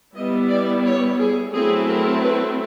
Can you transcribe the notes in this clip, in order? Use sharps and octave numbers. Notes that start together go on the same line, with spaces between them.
G3 B3 E4 D#5
D5
C#5
G#4
F#3 A3 C4 E4 G#4
A#4
B4